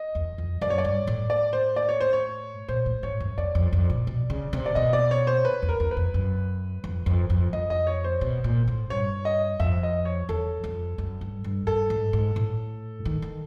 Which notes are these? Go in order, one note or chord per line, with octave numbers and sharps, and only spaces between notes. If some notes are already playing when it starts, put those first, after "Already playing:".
Already playing: D#5
E2
F2
F#2 D5
C#5
D5
G2
A2
D5
C5
D5
C#5
C5
C#5
A#2 C5
A2
G#2 C#5
F#2
F2 D5
F2
F2
A#2
B2
C#3
C3
D5
B2 D#5
D5
C#5
C5
B4
E2
A#4
E2
B4
F2
F#2
F2
F2
F2
F2 D#5
D#5
C#5
C5
B2
A#2
A2
G2 C#5
D#5
F2 E5
D#5
C#5
E2 A4
F2
F#2
G2
G2
G2 A4
G#2
G#2
A2
D#3
D#3